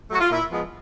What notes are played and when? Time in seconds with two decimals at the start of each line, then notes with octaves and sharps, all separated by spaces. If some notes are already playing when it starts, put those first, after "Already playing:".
0.11 F#3 A3 F#4
0.21 F4
0.30 A#2 E4
0.51 F3 G#3 B3